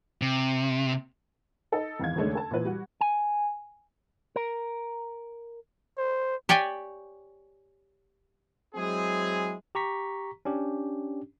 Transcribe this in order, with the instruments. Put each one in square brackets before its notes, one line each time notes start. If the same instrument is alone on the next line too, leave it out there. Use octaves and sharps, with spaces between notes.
[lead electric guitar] C3
[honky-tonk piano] D#4 A4 D#5
G#1 E2 F5 G#6
D#2 C#3 G#3 A3 C#4 D4
A4 A5
A#2 E3 B4
G3 F#4
[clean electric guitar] G#5
A#4
[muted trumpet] C5
[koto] G4 C#5 D5 G5 G#5
[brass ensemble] F#3 G#3 C4 E4 G#4
[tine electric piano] G4 A#5 C#6 B6
C#4 D4 G4